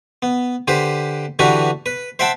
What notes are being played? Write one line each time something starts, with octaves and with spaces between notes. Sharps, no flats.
B3
D3 G4 B4 C5
D3 E3 D4 F#4 G4 B4
B4
C5 E5 F#5 G5 A5 B5